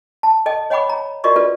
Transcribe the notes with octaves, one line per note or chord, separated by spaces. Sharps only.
A5
A4 D#5 G5
C#5 D#5 F#5 G5 B5 D6
A#5
F4 F#4 A#4 D5 D#5 C#6
F4 A4 B4 D5